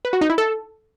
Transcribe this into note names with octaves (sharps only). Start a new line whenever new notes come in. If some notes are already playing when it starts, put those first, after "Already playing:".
B4
F#4
D#4
E4
A4